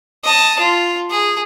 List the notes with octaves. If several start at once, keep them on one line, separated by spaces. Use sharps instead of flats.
D#5 A5
F4
G#4